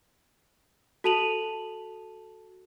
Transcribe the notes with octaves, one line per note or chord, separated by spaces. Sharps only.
F#4 A4 A5 D#7 F7 F#7